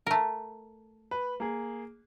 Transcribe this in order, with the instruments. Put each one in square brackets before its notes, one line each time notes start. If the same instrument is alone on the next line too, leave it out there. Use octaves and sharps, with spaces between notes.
[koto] A3 A#4
[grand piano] B4
A#3 G#4